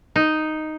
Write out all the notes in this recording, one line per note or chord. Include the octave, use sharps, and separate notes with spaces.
D#4